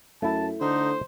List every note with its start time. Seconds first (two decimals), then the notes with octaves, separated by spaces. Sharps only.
0.22 F#2 A3 E4 A5
0.61 D3 D#4 C5